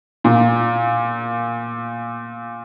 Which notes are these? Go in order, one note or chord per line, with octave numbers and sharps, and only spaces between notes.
A#2